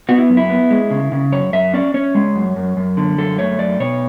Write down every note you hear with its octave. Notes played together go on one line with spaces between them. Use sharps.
B3 F#4
E4
F#2
E4
B3
G#3
C#3
C#3
F#2 C#5
F#2 E5
C#4 D5
C#4 C#5
G#3
F#2
F#2
F#2
D3
F#2 A4
A3 C#5
F#2 D5
B2 C#5